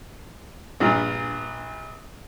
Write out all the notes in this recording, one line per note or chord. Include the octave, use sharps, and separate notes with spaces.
A#1 G2 A#2